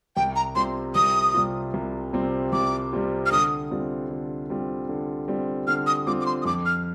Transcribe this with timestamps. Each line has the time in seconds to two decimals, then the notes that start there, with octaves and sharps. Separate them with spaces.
0.16 C2 G5
0.36 A#5
0.55 C3 G3 C4 F4 C6
0.95 C2 D#6
1.34 C3 G3 C4 F4
1.74 C2
2.13 C3 G3 C4 F4
2.53 C2 D6
2.93 C3 G3 C4 F4
3.26 F6
3.31 D3 D#6
3.71 G3 C4 F4
4.10 D3
4.49 G3 C4 F4
4.89 D3
5.28 G3 C4 F4
5.67 D3 F6
5.87 D#6
6.07 G3 C4 F4 D6
6.21 D6
6.26 C6
6.42 D#6
6.45 F2 D6
6.66 F6